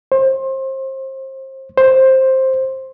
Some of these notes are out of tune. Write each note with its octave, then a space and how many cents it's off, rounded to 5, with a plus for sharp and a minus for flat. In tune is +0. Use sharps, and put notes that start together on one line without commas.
C5 +30
C5 +10